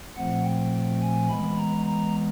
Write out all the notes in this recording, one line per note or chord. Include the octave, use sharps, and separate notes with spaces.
A#2 F3 A3 C4 F#5
G5
G#5
E3 G#3 B3 B5
A#5
A#5